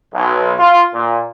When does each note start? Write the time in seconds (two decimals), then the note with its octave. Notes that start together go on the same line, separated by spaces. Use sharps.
0.13 B1
0.59 F4
0.94 A#2